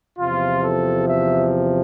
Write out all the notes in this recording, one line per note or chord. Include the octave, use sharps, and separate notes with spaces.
E2 C3 F3 F4
A4
E5